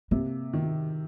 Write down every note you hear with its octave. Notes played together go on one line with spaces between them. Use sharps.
C3 A#3
D#3